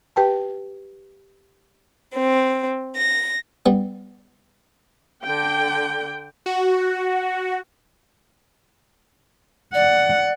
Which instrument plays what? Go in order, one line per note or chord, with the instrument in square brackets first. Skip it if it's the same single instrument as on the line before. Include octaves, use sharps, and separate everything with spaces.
[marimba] G4 B4 G5 A5
[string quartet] C4
A#6
[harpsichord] G3 B3
[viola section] D3 G5
[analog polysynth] F#4
[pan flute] D5 [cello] F#5